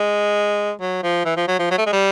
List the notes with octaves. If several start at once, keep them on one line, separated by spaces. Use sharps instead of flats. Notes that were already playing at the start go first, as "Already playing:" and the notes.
Already playing: G#3
F#3
F3
E3
F3
F#3
F3
F#3
A3
G#3
G3